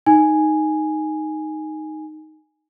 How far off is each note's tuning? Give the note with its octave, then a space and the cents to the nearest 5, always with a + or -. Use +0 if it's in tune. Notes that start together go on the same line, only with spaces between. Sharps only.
D#4 +0 G#5 +0